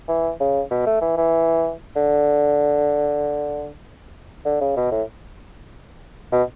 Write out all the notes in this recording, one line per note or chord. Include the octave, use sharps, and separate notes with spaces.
E3
C#3
B2
A3
E3
E3
D3
D3
C#3
B2
A2
B2